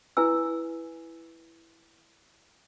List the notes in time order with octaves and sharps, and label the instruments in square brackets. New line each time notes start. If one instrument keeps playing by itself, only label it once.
[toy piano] E4 B4 G#5 E6